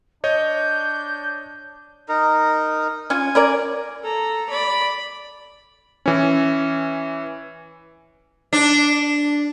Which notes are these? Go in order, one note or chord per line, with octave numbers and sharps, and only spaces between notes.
D4 C#5 D#5 G6
D#4 A#4
C#4 F4 G#5
C#4 A#4 D5
A4 A#5
D5 B5
E3 C#4
D4